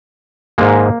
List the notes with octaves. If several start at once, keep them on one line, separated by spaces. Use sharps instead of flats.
G#2 D#3 G#3 A#3